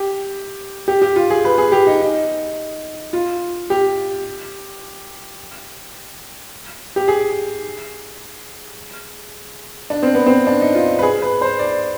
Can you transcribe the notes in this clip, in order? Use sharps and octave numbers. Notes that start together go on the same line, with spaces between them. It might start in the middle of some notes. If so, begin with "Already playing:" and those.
Already playing: G4
G4
G4
F4
G#4
B4
G#4
G4
D#4
D#4
F4
G4
G4
G#4
D4
C4
B3
C4
D4
D#4
F4
B4
G#4
B4
C5
D5